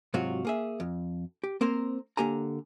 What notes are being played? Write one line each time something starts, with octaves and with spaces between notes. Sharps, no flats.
G#2 C3 F#3 F4 F#4
A#3 G#4 E5
F2
G4
A#3 C4 A#4 C5
D3 A#3 G4 G#5 A#5